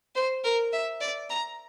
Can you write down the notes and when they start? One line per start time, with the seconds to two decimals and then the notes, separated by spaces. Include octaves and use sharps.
0.15 C5
0.44 A#4
0.73 E5
1.01 D5
1.29 A#5